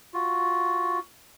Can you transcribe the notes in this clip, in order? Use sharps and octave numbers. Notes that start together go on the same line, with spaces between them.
F4 F#4